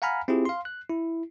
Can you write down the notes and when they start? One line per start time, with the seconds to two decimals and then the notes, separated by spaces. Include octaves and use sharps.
0.02 F5 F#5 G#5 A#5 B5 F6
0.28 C4 E4 F4 G4 G#4
0.45 F5 C6
0.65 F#6
0.89 E4